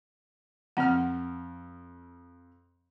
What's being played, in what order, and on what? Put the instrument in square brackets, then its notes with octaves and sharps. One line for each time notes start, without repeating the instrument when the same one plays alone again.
[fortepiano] F2 F6 [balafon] C4 F#5